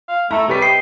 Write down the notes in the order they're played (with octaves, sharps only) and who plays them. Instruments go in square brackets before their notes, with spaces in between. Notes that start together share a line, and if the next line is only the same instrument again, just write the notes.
[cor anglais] F5
[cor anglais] A3 [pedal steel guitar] E4 A4 [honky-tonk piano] A#5
[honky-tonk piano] C3 B4 B6 [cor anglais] G3 [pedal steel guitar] C#5
[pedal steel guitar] C5 D#5 [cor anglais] G5 [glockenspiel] C7